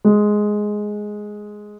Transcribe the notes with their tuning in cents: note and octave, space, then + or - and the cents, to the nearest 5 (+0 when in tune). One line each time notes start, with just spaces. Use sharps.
G#3 +5